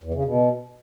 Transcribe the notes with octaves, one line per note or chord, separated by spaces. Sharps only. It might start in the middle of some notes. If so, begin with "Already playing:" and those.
E2
C#3
B2